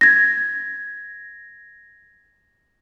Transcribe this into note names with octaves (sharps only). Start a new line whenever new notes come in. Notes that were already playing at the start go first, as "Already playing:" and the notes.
G#6 A#6